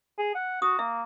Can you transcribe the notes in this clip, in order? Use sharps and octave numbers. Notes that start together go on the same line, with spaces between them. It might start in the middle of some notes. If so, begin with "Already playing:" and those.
G#4
F#5
F#4 D#6
A#3 E5